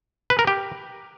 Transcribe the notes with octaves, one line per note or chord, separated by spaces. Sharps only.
B4
A#4
G4